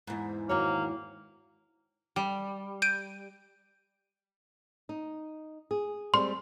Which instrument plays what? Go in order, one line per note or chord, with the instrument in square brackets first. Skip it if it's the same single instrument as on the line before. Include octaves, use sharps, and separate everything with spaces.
[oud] E2 G#2
[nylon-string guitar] D#3 F#4 C#5 [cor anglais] A#3
[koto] G3
[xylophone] G6 D7 D#7
[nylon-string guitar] D#4
G#4
[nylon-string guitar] G3 G#3 C4 [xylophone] C6